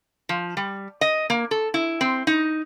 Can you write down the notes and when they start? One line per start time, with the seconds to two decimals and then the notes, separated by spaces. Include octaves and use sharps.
0.29 F3
0.57 G3
1.01 D#5
1.30 A#3
1.51 A4
1.74 E4
2.01 C4
2.27 D#4